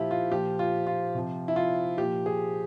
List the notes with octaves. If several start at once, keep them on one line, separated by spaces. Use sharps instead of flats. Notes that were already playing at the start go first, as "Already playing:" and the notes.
Already playing: A#2 F3 E4 F4 G4
F4
A#2 F3 G4
F4
F4
C3 F3
E4
F4
A#2 F3 G4
G#4